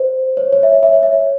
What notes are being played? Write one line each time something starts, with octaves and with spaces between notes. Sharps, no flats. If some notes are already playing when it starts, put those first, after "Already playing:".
Already playing: C5
C#5
C#5
E5
C#5
E5
C#5
E5
C#5